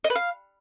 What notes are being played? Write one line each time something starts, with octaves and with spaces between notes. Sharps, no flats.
D#5
B4
F5